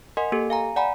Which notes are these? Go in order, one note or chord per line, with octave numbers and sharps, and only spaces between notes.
A#4 D#5 F#5 G#5 C6
A#3 G4 A4
F5 G#5 A#5
D5 F#5 G#5 A#5 B5